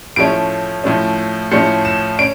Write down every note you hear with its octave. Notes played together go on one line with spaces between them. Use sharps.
A2 F3 A3 C#4 D7
A2 F3 A3 C#4
A2 F3 A3 C#4 C#7
E7
C#4 D7